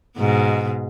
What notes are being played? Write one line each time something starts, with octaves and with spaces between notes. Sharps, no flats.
G#2 B2